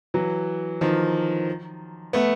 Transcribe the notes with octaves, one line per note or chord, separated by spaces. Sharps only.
E3 F#3
D#3 F3
A3 B3